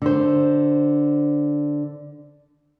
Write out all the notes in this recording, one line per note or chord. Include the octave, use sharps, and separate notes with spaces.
D3 C5